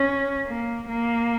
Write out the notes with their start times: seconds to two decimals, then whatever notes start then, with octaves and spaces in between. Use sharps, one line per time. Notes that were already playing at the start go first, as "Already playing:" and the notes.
Already playing: C#4
0.47 A#3
0.88 A#3